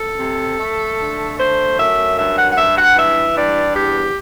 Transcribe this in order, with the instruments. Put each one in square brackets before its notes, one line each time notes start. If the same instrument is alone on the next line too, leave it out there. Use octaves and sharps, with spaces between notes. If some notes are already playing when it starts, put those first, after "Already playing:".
Already playing: [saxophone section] A4
C3
A3
D3
A3 C5
F#2 E5
G2 E5
F#5
F#5
G2 E5
F#5
E3 E5
G2 D5
E2 G4